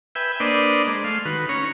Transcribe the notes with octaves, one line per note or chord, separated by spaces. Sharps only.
B4 E5 G5 G#5
A#3 D4 B4 C5 D5 D#5
G#3
A3 F5 C6
D#3 F#4 B4
C#4 C#5 A#5